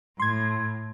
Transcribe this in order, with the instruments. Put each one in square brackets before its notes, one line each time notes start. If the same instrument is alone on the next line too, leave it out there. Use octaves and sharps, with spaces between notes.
[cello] A2 [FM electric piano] C6 G#6